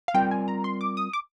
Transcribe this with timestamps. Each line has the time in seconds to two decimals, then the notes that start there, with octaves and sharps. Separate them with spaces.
0.08 F5
0.14 G3 C4 F4 A#4 D5 G5
0.31 G#5
0.48 A#5
0.64 C6
0.81 D6
0.97 D#6
1.13 D6